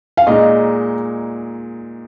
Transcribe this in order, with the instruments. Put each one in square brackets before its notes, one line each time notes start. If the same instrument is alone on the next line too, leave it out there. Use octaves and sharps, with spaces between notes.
[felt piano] F5
[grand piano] A#2 G#3 D#4 [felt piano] D#5